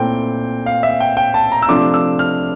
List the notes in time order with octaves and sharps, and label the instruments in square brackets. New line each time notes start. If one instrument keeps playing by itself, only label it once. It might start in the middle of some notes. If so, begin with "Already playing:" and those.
Already playing: [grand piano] A#2 A3 C4 E4 G5
F5
E5
G5
G5
A5
A#5
E6
C3 F3 A3 D4 F4 D6
E6
F6